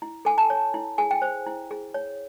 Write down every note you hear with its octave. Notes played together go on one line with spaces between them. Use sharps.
E4
A4 G#5
A5
C#5
E4
G#4 G#5
G5
C5
E4
G#4
C#5